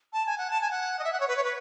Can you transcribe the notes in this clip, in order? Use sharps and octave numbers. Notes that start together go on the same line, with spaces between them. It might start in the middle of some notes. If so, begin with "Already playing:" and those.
A5
G#5
F#5
A5
G#5
F#5
D#5
E5
F#5
C#5
B4
C#5
B4